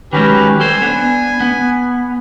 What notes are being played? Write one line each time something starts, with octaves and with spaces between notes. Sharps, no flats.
D#3 F#3 G#3 C#4 G4 B4
G3 A4 C5 G#5
B3 D4
B3